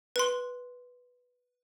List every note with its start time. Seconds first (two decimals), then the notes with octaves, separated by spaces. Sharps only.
0.16 B4 C6